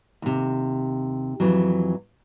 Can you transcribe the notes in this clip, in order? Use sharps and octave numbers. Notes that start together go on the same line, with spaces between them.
D#2 C3
F2 E3 F#3